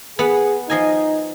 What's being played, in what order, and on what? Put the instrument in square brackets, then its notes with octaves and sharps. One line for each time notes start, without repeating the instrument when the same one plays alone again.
[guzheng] B3 F#5 [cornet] G#4
[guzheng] F3 D#5 G#5 [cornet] D#4